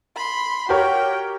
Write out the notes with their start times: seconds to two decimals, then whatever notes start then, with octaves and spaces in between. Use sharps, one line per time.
0.16 B5 C6
0.69 F#4 G4 A#4 C#5 G5